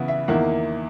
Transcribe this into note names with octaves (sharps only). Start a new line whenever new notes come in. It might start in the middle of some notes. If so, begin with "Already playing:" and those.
Already playing: C#3 E3 B3 E4 F#5
E5
E2 D#3 A#3 E4 F#5